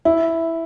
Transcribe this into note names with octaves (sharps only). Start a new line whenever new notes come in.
E4